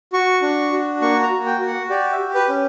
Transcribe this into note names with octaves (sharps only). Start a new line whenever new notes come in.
F#4 C#6
D4
F#4
A#3 C#6
A#5
F#4
G5
F#4
F#5
G4 D5
E5
G4
B4
C#4